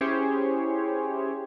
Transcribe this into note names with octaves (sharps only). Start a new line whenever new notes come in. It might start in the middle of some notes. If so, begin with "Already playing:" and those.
C#4 E4 G4 G#4 C5 C#5